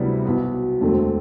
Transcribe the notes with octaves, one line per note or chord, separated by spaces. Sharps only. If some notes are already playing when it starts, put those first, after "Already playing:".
Already playing: D2 C3 G3 B3 E4
B1 B2 B3
E1 D2 D3 A3 C4